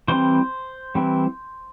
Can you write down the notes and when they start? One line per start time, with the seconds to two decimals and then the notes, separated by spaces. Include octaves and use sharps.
0.08 E3 G3 C4 C5 C6
0.95 E3 G3 C4